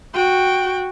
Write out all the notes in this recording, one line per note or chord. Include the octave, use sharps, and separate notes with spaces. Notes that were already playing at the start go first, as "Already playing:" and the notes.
F#4 G5